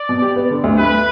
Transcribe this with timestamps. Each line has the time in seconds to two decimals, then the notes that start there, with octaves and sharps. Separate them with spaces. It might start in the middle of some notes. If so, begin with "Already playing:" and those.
Already playing: D5
0.09 B2
0.22 G4
0.36 B3
0.51 D3
0.64 D2
0.78 D2 B4